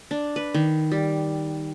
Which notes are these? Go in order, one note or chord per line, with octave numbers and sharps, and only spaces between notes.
D4
B4
D#3
G3